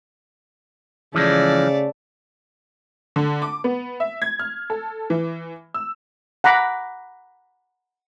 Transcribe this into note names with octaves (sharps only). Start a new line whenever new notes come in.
C#3 E3 F3 G#3 A3 D5
D3
D6
B3
E5
G#6
F6
A4
E3
E6
F#5 A#5 B5 D6